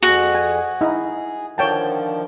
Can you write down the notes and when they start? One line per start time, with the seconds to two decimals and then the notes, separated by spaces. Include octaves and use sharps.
0.03 F2 F#4 G#4
0.35 G#5
0.81 D#4 E4 G#4
1.58 D3 D#3 F3 C#5 G5 A5